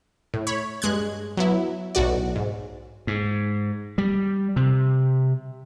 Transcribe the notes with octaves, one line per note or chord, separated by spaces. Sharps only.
A2
C#5 B5
G2 G#3 F#6 G#6
F#3 B3 E4
B1 A2 F#4 D5
G#2
G#2
G3
C3